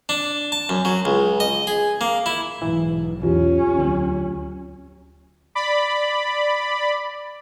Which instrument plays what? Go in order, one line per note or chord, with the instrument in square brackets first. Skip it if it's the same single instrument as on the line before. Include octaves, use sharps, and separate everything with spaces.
[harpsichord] D4
A5
F#2
F#3
C#2
D#5
G#4
A#3
E4
[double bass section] B1 G#2 [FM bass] E3
[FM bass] E2 [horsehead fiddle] C#4 [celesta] F4 G4
[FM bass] D2 [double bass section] F#3
[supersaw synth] D5 B5